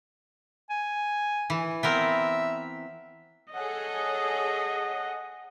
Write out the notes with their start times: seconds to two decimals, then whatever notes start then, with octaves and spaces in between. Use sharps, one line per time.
0.70 G#5
1.50 E3
1.83 B3 C4 A#4 E5
3.53 G#4 A4 C#5 D#5 F#5